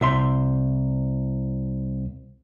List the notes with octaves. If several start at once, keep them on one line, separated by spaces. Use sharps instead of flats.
C2 E5 C6